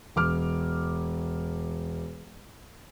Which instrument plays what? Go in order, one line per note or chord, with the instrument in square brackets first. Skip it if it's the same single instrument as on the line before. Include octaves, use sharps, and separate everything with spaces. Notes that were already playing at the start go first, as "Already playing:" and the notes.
[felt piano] E1 D6 F6